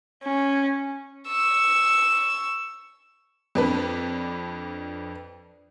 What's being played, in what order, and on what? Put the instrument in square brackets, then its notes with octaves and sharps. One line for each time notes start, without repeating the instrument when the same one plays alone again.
[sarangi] C#4
[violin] C#6 E6
[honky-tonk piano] F2 D4 B4